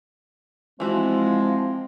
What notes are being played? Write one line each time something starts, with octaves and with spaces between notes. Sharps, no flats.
E3 F3 G#3 C4 E4 F#4